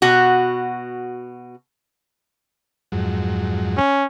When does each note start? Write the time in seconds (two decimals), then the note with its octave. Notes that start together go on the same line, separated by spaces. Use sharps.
0.02 B2 F#4
2.92 F2 G#2 F#3
3.77 C#4